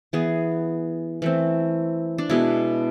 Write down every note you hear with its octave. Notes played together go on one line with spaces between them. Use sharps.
E3 B3 G#4
E3 A3 C4
D4
B2 G#3 B3 E4